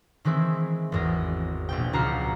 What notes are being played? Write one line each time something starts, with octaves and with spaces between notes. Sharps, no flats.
D#3 E3 G#3 C4 E4
G#1 E2 A#6
A#1 B2 G5
C#2 F#4 A#5 F6 C7 C#7